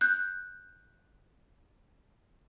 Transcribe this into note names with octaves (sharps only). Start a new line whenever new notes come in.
F#6 G6